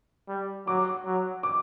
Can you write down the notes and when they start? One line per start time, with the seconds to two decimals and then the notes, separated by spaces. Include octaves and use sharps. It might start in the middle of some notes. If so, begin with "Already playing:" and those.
0.29 G3
0.67 F#3 D6
1.05 F#3
1.43 D6